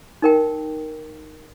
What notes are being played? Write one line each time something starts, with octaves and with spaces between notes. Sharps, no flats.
D#4 A#4 G5